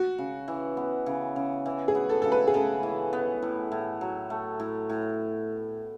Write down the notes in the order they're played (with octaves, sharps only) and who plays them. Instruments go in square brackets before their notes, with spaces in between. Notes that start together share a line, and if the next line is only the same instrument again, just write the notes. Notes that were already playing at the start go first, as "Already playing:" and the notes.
Already playing: [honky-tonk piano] F#4
[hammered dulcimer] C#3
E3
B3
C#3
C#3
E3
[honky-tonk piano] G#4
[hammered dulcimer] B3
[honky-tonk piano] A4
[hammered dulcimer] C#3 [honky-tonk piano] A4
[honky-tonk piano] B4
G#4
[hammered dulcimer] C#3 [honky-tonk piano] A4
[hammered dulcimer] E3
B3
A2
A2
F#3
A3
A2
A2